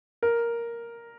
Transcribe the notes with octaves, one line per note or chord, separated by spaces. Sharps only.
A#4